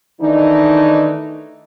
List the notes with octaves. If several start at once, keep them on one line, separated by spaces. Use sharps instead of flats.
D#3 E3 A3 D4 D#4